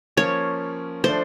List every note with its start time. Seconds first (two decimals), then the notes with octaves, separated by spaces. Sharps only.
0.17 F3 A#3 C#4 C#5
1.04 F3 A3 D4 C5